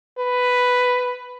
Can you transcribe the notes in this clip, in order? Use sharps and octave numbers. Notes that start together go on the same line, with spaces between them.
B4